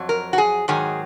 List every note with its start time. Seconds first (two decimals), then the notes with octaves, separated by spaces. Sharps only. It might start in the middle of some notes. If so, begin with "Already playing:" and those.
Already playing: F2 F#3
0.09 A#4
0.33 F#4
0.38 G#4
0.68 G#2 D#3 F#3 G#4